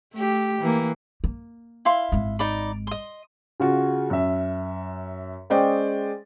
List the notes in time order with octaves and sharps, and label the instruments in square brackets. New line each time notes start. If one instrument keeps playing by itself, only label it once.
[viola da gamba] A3 G4
E3 A#3
[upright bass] A#3
[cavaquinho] E4 F5 C6
[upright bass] G#1 G#3
[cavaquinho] D#4 D5 B5
D#5 C6
[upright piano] C#3 F4 F#4
F#2 E5
G#3 C#4 C5 D5 D#5 G5